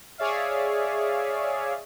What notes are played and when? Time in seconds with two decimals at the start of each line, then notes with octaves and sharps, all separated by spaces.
0.18 G#4 C#5 D5 E5 F5